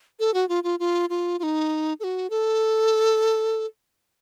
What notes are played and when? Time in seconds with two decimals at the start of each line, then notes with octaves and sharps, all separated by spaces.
0.20 A4
0.34 F#4
0.49 F4
0.63 F4
0.79 F4
1.09 F4
1.39 F4
1.43 D#4
2.00 A4
2.04 F#4
2.30 A4